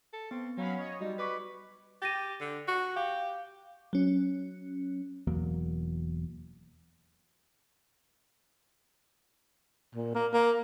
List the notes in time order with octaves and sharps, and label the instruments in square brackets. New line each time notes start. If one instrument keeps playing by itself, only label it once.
[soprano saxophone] A4
[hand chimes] B3 [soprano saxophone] C4
[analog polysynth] F#3 F5 B5 [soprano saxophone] C#4
[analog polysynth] C#5 D#5
[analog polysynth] G3 [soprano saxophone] D#4 [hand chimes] F#4 D#5
[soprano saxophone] B4 [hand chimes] C#6 D6 B6
[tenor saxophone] G4 [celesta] A6 A#6 D#7
[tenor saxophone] D3
F#4
[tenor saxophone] G4 [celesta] F5
[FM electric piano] F#3 C#4
[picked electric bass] E1 E2 F#3 A#3
[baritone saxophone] A#2
A#3
A#3